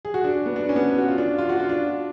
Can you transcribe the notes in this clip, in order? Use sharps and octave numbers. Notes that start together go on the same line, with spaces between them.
G#4
F#4
D4
B3
D4
C#4
B3
F#4
F4
D4
F4
F#4
F4
D4